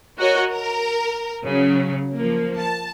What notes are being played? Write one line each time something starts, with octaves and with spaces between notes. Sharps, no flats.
F#4 A#4 C#5 D#5
A#4
C#3 F#3
F3 A#3
A5